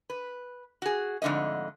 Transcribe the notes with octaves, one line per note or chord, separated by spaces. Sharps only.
B4
F#4 G#4
F2 G#2 D3 A3 D#5